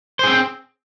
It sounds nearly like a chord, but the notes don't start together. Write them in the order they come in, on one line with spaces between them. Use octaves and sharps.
C5 G#4 C4